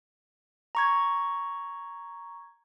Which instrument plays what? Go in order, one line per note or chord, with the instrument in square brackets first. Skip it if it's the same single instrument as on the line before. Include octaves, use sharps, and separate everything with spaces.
[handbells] A#5 C#6 G#6